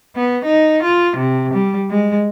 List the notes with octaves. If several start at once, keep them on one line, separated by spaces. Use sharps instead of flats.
B3
D#4
F4
C3
G3
G#3